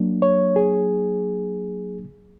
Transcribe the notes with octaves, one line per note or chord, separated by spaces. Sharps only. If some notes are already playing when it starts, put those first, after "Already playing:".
Already playing: F#3 A#3 D4
C#5
G#4